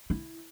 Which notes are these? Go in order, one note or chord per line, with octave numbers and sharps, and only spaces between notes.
E4